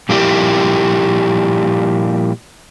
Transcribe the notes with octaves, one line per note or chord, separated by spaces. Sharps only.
A#2 F3 G3 A#3 E4 G4